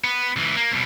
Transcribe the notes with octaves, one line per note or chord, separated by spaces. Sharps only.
B3
C#2 E3
A#3
C2 B2